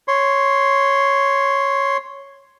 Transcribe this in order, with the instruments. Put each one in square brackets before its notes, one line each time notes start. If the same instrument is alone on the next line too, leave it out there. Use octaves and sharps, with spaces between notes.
[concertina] C#5 C6